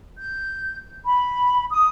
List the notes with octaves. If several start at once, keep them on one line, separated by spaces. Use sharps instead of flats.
G6
B5
D#6